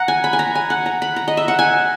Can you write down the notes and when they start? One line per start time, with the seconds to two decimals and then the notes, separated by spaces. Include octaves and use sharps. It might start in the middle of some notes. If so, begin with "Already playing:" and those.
Already playing: F#5 A#5
0.08 G#5
0.24 B5
0.33 G#5
0.39 A#5
0.55 G#5
0.70 F#5
0.86 A#5
1.02 B5
1.16 A#5
1.28 D#5
1.37 E5
1.48 F#5
1.59 G#5